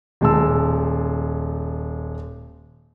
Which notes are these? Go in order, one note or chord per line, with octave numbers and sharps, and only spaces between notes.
D#1 G#3 A5 E6